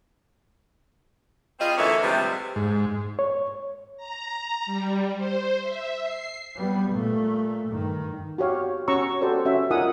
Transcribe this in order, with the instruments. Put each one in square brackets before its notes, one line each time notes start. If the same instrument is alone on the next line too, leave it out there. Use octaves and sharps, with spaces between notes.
[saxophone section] G3 C4 F4 G#4 D#5
D2 E3 A#3 C#4 A4 E5
A2 C3 E3 F3 G3 G#3
[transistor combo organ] G#2
[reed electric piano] C#5
[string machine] A#5
G3
C5
E5
C7
[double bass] G3 B3
A#2 A3
G2 D#3
[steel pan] F#4 G4 C#5 F5
C#4 F#4 C#5 A#5 C#6 E6
F#4 G4 A4 C5 D5
C#4 F#4 E5
D#4 F4 A#4 F#5 G#5 D#6